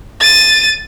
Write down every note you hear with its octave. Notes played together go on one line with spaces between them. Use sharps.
A6 D#7